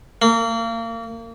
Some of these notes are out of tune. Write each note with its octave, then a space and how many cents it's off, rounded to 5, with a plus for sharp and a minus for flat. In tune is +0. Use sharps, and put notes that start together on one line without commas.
A#3 -30